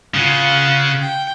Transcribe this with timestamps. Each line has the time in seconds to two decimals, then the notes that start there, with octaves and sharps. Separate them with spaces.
0.14 C#3 F4 F#5
1.00 G5